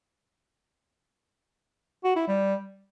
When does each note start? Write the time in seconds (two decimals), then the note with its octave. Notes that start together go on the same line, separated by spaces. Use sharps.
2.04 F#4
2.16 E4
2.28 G3